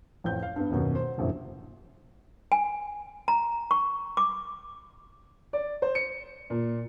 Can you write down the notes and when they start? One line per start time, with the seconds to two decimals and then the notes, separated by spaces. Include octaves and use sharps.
0.24 A1 F2 G5 G6
0.43 F5
0.56 G2 B3
0.70 D#1 F#2 B2
0.95 C5
1.18 F1 A#1 F#2 E3 E4
2.52 G#5
3.28 A#5
3.71 C#6
4.17 D6
5.53 D5
5.82 C5
5.95 C#7
6.50 A#2